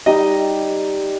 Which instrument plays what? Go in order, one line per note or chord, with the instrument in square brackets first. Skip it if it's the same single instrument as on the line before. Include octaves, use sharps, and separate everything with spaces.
[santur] G3 D#4 G4 [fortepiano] D#5